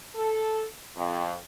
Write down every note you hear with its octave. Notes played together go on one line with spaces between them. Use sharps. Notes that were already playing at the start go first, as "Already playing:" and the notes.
A4
F2